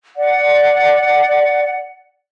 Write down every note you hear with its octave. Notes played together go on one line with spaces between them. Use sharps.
D5 F#5